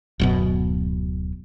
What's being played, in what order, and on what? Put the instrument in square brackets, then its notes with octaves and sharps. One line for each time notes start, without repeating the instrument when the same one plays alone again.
[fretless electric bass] D1 F#2 B2